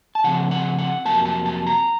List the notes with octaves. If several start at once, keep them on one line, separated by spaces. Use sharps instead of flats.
A5
C#3 F3 C4 F#5
F#5
F#5
F2 C3 F#3 A#3 A5
A5
A5
A#5